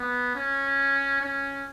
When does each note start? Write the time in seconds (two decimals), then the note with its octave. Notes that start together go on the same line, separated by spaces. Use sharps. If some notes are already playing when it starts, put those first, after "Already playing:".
Already playing: B3
0.35 C#4
1.21 C#4